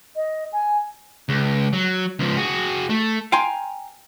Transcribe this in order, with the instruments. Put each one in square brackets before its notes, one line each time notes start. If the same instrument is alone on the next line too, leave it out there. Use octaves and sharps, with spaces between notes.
[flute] D#5
G#5
[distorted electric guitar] C#2
F#3
C#2 F3
F#4 G#4
A3
[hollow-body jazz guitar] F5 G5 G#5 A#5 C6